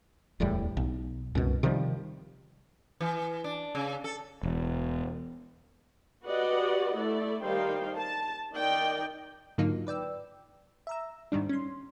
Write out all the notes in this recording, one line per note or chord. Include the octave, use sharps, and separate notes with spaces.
D1 E2 A2 G3
B1
C2 F#2 B2
C3 D#3 F3 G3
E3
D4
C#3
A4
E1
F#4 G4 B4 D5 D#5 F#5
A3 E4 A4 D5
D#3 G3 D#4 C5 F5 G5
A5
D#3 D5 D#5 G5
G#2 D3 F#3 A#3 D#4 F4
B4 D5 G5 E6
E5 A#5 E6
G#2 D#3 G3 D4
C#4 C6